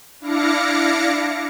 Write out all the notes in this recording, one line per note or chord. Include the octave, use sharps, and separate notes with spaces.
D4 E4 F5 D6 A#6 C#7